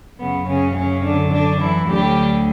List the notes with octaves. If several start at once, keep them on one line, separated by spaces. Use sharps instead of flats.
F#2 C#3 F#3 B3
C#3 C#4
C#3 C#4
D3 D4
D3 D4
E3 E4
D2 D3 F#3 G3 G4